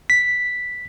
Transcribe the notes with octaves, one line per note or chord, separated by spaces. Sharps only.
B6